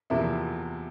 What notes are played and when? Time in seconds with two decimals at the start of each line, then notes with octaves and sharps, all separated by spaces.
0.10 E2 C3 F3 A#3 E4